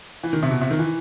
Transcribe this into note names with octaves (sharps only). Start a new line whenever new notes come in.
E3
D#3
C3
B2
C3
D#3
E3